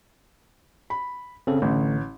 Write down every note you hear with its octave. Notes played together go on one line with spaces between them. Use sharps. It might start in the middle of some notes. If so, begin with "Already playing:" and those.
B5
C#3 C4 A4
A1 D3 A3